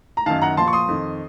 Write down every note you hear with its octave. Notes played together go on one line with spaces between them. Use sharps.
A#5
F#2 D#3 F5 A5
F#5 A#5
A#2 F3 A5 C6
C#6
C6 D#6
F2 D#3